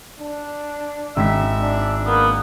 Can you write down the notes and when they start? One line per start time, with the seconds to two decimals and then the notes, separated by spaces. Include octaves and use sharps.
0.20 D4
1.17 G#1 E5 B6
1.61 D4
2.06 A#3 B3